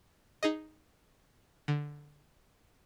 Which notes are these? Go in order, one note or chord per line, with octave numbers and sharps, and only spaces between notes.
D#4 G#4 D#5
D3